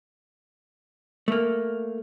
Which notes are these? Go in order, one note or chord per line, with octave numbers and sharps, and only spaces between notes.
A3 A#3